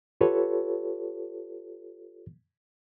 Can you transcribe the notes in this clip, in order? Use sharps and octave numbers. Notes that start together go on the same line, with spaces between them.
F4 G4 A4 B4 C#5